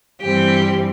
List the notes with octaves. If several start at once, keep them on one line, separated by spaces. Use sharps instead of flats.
G2 E3 G3 C4 G4